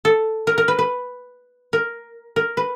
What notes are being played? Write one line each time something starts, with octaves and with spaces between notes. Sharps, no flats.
A4
A#4
A#4
B4
B4
A#4
A#4
B4